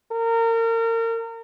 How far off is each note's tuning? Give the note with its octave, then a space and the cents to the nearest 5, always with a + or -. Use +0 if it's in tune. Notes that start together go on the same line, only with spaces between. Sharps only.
A#4 -30